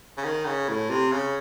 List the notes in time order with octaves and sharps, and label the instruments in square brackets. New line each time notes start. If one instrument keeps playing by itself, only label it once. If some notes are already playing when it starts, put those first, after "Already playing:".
[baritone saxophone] C#3
D#3
C#3
A2
C3
C#3